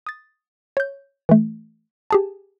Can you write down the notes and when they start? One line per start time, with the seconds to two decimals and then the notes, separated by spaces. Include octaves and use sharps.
0.07 D#6 A6
0.77 C#5 G6
1.29 E3 A3
2.11 G4 G#4 A5